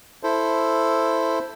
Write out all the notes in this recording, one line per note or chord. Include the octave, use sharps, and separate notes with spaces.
E4 A4 C5